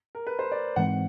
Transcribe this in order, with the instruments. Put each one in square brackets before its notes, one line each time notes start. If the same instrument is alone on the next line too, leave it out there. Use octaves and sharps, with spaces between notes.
[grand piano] A#4
B4
C5
D5
[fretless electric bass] G#2 E3 G#3 C4 [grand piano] F#5